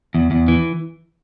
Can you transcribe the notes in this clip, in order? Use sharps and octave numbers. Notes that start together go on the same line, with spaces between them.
E2
E2
E3